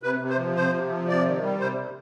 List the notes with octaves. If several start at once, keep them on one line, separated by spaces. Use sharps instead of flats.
C3 B4
C3
C5
F3
C3 C5
C3
F3
C3 D5
D#3
G3
C3 C5
C3